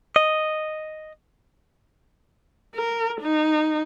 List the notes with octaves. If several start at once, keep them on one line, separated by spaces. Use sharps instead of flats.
D#5
A#4
D#4